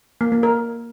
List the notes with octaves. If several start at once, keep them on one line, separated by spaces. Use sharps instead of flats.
A#3
A#3
A#4